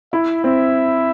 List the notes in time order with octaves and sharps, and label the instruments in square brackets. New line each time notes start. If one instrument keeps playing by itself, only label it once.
[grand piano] E4 [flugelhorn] E5
[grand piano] C4 [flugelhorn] E5